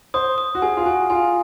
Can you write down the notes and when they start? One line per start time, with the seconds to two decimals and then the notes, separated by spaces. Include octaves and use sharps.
0.14 C5 D#6
0.38 D#6
0.55 F#4
0.62 G#4 G#5
0.77 F4
0.86 F#4 G#5
1.10 F4 G#5